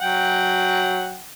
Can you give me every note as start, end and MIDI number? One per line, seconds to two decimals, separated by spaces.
0.01 1.22 54
0.01 1.22 78
0.01 1.22 79